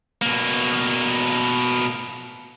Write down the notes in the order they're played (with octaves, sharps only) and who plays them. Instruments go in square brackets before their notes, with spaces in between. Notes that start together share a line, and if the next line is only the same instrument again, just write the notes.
[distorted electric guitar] B2 A#3